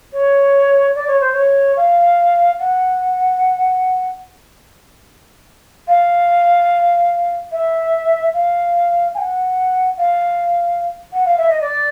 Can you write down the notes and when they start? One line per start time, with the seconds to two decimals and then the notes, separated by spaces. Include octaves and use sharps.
0.13 C#5
0.95 D5
1.07 C#5
1.20 C5
1.32 C#5
1.76 F5
2.59 F#5
5.87 F5
7.51 E5
8.33 F5
9.14 G#5
9.18 F#5
9.97 F5
11.12 F#5
11.25 F5
11.37 E5
11.49 D#5
11.61 D5